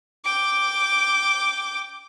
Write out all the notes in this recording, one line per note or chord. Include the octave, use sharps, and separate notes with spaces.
G5 D6